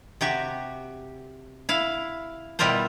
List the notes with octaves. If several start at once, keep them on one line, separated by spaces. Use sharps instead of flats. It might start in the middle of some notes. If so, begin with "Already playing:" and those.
C3 F#4 G4
E4 F5
B2 G3 E4 F4 A#4 C5